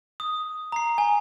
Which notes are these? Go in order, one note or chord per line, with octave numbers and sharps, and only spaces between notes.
D#6
A#5 C7
G#5